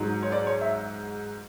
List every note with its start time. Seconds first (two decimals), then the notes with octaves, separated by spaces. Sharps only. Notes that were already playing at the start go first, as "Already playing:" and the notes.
Already playing: G#2 F#3
0.22 C#5
0.32 D5
0.47 C#5
0.61 E5